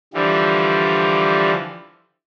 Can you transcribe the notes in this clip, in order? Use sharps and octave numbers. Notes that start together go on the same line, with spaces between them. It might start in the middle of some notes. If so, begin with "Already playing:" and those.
D3 E3 F3 G3